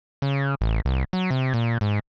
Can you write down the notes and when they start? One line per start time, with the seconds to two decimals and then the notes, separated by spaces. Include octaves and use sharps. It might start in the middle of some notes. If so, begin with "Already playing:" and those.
0.22 C#3
0.61 A1
0.85 C2
1.13 F#3
1.31 C3
1.54 A#2
1.81 G#2